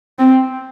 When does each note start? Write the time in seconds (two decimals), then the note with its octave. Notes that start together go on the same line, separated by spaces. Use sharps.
0.19 C4